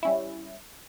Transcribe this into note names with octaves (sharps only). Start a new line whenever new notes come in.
G3 C#4 E4